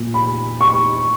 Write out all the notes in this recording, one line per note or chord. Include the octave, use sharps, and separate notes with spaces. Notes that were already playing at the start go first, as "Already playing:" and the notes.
Already playing: A#2
B5
C#6